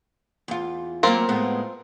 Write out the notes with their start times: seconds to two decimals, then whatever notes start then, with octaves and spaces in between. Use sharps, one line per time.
0.48 E2 F4
1.03 F#3 A3 A#3 C4 F4 A#4
1.29 A2 G#3 B3